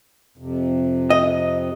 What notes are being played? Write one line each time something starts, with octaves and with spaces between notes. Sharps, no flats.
F2 C3
D#5